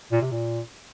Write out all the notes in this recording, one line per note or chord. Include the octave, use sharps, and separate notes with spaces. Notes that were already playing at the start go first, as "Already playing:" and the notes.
A#2
C3
A#2